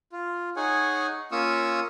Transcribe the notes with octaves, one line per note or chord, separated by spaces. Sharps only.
F4
D#4 G#4 C#5 F#5 G#5
A#3 C#4 F4 C#6 D#6 E6